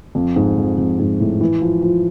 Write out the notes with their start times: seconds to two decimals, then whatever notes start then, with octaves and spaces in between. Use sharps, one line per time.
0.15 F2
0.36 G#2
0.57 F2
0.78 F2
0.99 G#2
1.20 A2
1.41 E3
1.62 F3
1.82 F3